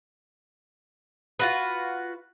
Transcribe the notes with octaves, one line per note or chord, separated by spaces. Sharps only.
F4 F#4 B4